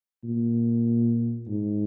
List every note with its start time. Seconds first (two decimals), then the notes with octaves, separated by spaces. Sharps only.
0.24 A#2
1.49 G#2